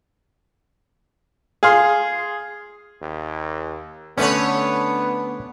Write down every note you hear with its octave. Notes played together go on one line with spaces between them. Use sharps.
G#4 F5 C6
D#2
D3 A3 B3 C#4 D4 B4 C#5